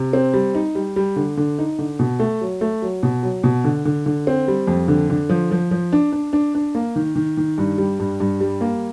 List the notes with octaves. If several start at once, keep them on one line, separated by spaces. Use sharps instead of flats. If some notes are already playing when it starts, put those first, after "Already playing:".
Already playing: C3
C4
G3
D#4
G3
G3
D3
D3
D#4
D3
B2
A3
F#3
A3
F#3
B2
F#3
B2
D3
D3
D3
C4
G3
F2
D3
D3
F3
F3
F3
D4
D4
D4
D4
A#3
D#3
D#3
D#3
G2
G3
G2
G2
G3
A#3